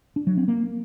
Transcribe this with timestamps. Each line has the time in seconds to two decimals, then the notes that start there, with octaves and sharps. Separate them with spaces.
0.16 D4
0.27 F#3
0.37 C4
0.48 A#3